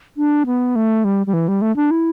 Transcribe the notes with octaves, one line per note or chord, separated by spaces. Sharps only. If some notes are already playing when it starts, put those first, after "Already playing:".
D4
B3
A3
G3
G3
E3
G3
A3
D4
E4